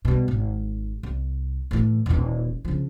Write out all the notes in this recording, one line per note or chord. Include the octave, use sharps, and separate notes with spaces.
B2 G3
G#1
C2
A2 E3
D#1 E3
C#3 F3